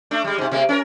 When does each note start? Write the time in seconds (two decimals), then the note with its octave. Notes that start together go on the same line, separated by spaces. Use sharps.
0.11 A3 D4
0.24 G3 G#3
0.38 G#2 C3
0.51 C3 G#3 A#3
0.69 C#4 A4 A#4